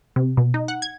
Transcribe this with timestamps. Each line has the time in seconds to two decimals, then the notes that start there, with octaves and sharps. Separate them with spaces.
0.16 C3
0.37 B2
0.54 D#4
0.68 F#5
0.82 G#6